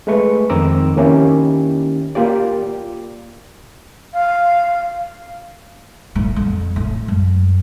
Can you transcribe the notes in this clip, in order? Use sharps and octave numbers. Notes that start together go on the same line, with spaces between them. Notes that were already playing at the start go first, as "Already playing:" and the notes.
G#3 A3 B4 C#6
F2 D#3 C4 A#5 D6 E6
D#3 A#3 C#4 E4 G4
A#3 F4 G4 D5
F5
A2
F2
A2
F#2